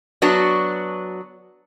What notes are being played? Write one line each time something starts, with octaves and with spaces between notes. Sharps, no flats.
F#3 B3 D4 F#4